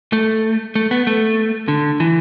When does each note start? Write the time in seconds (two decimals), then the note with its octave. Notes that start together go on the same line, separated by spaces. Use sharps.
0.13 A3
0.75 A3
0.91 B3
1.07 A3
1.68 D3
2.00 E3